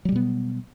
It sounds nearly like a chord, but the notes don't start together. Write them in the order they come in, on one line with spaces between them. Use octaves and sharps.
F#3 G3 B2 B3